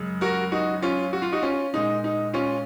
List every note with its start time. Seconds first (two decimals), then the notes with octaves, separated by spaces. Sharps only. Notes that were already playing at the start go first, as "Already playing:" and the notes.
Already playing: F#2 C#3 G#3
0.21 F#4 A#4
0.52 D#4 F#4
0.82 C#4 F4
1.13 F#4
1.22 F4
1.32 D#4 F#4
1.42 C#4 F4
1.74 A#2 G#3 D#4
2.04 D#4
2.33 C#4 F4